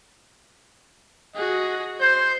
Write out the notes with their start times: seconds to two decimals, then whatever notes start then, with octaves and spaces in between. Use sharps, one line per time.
1.35 F#4 G#4 D#5
2.01 C5 G6